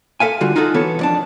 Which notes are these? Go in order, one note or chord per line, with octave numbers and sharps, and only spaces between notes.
A4 E5 F5 G#5
D3 G3 F4 F#4
D#4 F4 F#4 G#4 A4
E3 B3 A4 C#5
F2 D4 A5